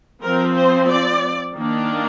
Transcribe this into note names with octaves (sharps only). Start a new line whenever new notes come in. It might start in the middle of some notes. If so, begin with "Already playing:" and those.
F3 C4 A#4
C5
D5
D#3 A#3 D4